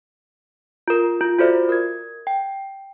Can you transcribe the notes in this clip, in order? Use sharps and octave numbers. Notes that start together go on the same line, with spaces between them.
F4 A#4
F4
F4 F#4 A4 C5 D5 E5
A#4 G#6
G5